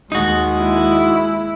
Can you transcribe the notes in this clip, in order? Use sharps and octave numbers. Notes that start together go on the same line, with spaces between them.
D#2 G#3 D#4 F#4
E4